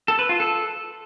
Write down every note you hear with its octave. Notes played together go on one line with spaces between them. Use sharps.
A4
B4
F4
A4